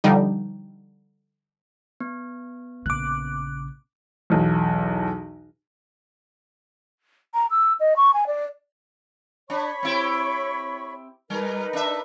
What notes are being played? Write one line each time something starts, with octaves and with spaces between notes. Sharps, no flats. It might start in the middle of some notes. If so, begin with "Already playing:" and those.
D3 F3 G3 D#4
B3
A#1 C#3 D6 F#6
B1 E2
A#5
E6
D#5
C#6
G#5
D5
D4 C#5 B5 C#6
C4 E4 G4
G3 D#4 A#4 B4
D4 E5